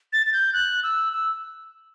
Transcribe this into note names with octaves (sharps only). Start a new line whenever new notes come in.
A6
A6
G6
F#6
E6
E6